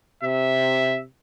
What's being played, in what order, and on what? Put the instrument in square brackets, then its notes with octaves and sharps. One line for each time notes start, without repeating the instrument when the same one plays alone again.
[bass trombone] C3 [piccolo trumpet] E5